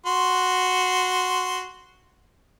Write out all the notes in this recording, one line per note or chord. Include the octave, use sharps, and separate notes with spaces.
F#4 C6